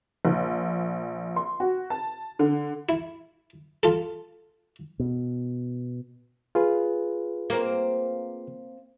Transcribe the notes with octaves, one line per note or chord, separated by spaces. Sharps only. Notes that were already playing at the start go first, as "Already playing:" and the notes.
A#1
C6
F#4
A5
D3
E4
F4 A4
B2
F4 G#4 B4
A#3 C4